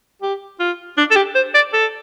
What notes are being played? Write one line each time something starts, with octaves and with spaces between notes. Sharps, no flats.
G4
F4
D4
A4
G4
C5
D5
A4